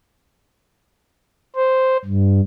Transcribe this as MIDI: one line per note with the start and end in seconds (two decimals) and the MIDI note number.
1.56 1.97 72
2.05 2.41 43